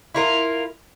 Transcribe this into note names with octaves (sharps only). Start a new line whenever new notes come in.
E4 F4 A#4